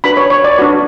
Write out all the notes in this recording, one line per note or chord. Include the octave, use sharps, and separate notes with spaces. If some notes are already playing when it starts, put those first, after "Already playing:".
D4 F#4 B4 B5
C#5
C#5
D5
D4 F#4 B4